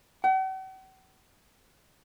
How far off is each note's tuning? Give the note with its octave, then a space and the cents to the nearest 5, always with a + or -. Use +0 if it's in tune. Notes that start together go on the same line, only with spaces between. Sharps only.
F#5 +45